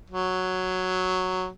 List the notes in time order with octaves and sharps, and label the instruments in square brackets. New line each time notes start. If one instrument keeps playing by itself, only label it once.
[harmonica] F#3